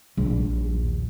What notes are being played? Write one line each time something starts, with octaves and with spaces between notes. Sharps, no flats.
A#1 D#2